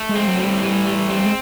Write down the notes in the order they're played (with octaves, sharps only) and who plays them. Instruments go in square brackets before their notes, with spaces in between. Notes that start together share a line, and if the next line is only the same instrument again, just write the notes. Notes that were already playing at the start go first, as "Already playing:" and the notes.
Already playing: [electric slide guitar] A3
[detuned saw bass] G#3
[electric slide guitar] C4
[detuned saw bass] F#3
[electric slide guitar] A2
[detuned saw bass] G3
[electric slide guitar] E3
A3
C4
[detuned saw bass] G#3